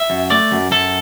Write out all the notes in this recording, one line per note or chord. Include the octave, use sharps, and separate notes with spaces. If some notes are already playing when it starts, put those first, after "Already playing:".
Already playing: E5
F#2
A3 D5
F#2
F#2 A4